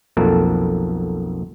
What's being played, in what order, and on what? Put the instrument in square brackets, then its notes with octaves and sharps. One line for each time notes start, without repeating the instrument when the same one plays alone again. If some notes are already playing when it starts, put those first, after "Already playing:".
[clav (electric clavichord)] B1 F2 A#3 A4